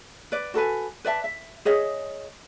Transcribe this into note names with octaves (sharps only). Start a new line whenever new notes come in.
B4 D5
F#4 A4 B4 G#5
B4 D5 E5 A5
E5
G#4 C#5 D#5 E5